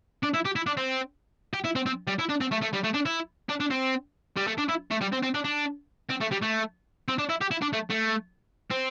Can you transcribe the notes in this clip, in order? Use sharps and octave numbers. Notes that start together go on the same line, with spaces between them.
D4
E4
G4
E4
D4
C4
G4
E4
C4
C4
G3
E4
D4
C4
A3
A3
G3
A3
D4
E4
D4
D4
C4
G3
A3
D4
E4
A3
G3
C4
C4
D4
D4
C4
A3
G3
A3
C4
D4
E4
G4
E4
D4
A3
A3
C4